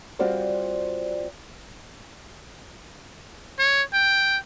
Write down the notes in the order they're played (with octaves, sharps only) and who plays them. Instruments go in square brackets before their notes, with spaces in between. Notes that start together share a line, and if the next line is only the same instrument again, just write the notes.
[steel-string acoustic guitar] G3 C4 F4 F#4 C5 D5
[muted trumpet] C#5
G5